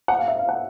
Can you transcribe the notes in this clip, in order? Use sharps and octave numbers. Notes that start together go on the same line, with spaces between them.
F#5
F5
E5
F5
F#5